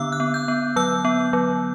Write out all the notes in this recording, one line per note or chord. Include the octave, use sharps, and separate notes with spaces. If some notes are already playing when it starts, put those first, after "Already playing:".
Already playing: D3 B3 D4 D6 E6 F#6
F#6
B3
G6
B3
F#3 E6
B3
F#3